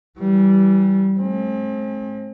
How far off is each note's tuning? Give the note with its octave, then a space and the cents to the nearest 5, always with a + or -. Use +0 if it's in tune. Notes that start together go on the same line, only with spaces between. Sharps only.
E3 +0 G3 -20
A3 -45 C4 +40